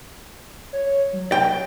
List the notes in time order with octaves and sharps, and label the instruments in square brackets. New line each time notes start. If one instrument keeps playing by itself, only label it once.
[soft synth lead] C#5
F#3
[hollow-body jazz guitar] G5